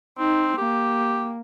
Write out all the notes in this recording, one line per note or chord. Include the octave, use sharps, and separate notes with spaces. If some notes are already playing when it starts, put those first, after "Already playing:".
C4 D#4
A#3 G4